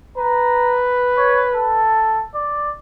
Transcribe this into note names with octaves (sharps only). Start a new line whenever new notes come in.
B4 A#5
C#5
A4
D5